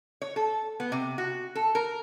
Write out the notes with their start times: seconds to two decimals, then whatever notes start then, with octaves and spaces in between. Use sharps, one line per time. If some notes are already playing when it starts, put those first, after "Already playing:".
0.22 C#5
0.36 A4
0.80 B3
0.92 C3
1.18 F#4
1.55 A4
1.75 A#4